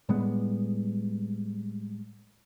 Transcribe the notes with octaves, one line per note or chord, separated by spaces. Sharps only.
A2 G3 G#3 B3